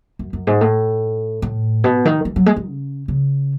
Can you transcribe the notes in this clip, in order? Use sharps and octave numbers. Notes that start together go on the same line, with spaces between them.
F#2
F#2
G#2
A2
A2
B2
D#3
E3
F#3
G#3
G#3
C#3
C#3